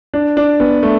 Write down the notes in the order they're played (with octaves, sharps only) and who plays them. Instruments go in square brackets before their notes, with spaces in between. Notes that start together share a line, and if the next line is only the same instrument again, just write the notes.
[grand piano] D4
D4
B3
A3